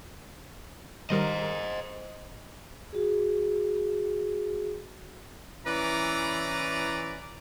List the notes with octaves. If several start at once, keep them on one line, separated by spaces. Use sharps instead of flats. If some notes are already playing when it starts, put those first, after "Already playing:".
D#3 G3 A#4 C5 D#5
F#4 G#4
E3 C#4 E4 B4 D5 A#5